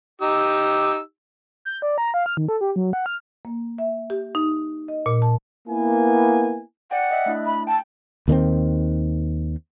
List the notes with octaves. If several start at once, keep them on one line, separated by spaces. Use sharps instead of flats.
D#4 G4 E6
G6
D5
A#5
F5
F6
D#3
A4
G4
F#3
F#5
F6
A#3
E5
G4
D#4
D#5
A#2
A5
A#3 B3 E4 G#5
D5 F#5 G5
D#5 E5 F#6
A3 D4 E4
B5
G5 A5
D#2 D#3 F#3 C4